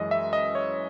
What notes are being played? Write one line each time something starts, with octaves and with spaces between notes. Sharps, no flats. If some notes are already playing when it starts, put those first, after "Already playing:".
Already playing: F#2 E3 G#3 D#5
E5
D#5
C#5